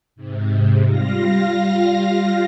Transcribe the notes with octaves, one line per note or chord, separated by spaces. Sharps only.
G#2 C3
G3 F4 F5 A#6